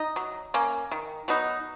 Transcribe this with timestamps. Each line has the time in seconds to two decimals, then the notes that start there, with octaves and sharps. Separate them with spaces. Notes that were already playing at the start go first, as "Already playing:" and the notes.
Already playing: D#4 D#5
0.16 F#3
0.54 A#3 C#4
0.91 D#3
1.28 F#3 B3 D#4